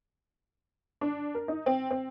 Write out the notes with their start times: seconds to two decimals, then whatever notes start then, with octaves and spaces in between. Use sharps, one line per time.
1.01 D4
1.35 A#4
1.48 D#4
1.66 C4
1.91 C4